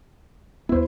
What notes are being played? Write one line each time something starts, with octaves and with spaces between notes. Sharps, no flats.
D#2 B3 E4 C5